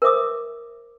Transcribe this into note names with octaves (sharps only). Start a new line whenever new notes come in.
A#4 C5 E5 D6 D#6